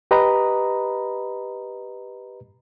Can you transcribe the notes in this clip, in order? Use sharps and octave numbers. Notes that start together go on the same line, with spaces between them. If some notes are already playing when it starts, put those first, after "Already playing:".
G4 B4 D#5 A#5 B5